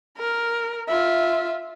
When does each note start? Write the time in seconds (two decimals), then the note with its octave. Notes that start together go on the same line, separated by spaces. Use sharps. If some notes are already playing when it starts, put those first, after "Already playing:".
0.18 A#4
0.88 F4 E5